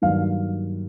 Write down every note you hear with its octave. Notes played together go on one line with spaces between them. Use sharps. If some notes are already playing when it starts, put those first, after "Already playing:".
G2 D#3 F#3 A#3 F5